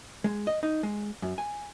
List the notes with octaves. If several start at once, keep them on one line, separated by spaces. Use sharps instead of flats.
G#3
D#5
D#4
G#3
F#2
G#5